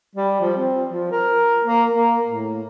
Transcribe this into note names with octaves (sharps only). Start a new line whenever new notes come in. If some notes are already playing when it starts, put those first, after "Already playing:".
G3
F3
C4
F3
A#4
A#3
A#3
A2